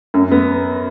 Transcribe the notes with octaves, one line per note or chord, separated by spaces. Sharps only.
F#2
B3